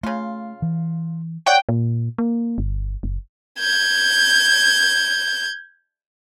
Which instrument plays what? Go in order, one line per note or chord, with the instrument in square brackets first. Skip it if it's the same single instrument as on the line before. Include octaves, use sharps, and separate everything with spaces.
[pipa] C#3 F4 [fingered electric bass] A3
[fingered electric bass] E3
[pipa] C#5 D5 F#5 [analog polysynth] G5
[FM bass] A#2
A#3
G1
F#1
[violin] G6 G#6